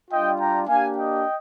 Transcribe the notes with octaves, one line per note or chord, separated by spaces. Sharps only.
G3 D4 F4 D#5 G5
G5 A#5
A#3 D4 G4 F5 G#5
D#5 G5